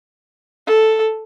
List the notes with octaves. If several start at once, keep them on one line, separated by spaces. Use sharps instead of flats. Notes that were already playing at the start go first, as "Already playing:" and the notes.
A4